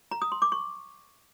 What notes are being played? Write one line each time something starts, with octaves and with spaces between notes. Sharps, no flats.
A#5
D#6
C6
D6
C#6